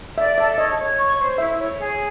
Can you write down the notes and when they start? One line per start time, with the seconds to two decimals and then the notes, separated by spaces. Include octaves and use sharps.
0.18 D5 E5
0.38 A4 E5
0.58 C#5 D#5
0.78 C#5
0.98 C#6
1.18 C5
1.38 E4 E5
1.59 C#5
1.78 G#4